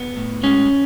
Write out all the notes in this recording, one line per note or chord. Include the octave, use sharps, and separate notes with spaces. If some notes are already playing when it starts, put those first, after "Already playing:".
Already playing: B3
A2
G#3 C#4